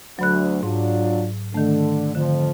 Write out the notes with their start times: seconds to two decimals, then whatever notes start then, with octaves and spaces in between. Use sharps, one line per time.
0.19 D2 F#3 B5 F#6
0.63 G#2 F#3 D4 F4
1.54 D3 D#3 A3
2.15 F2 D3 F3